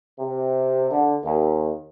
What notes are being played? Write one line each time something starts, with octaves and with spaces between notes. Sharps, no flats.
C3
D3
D#2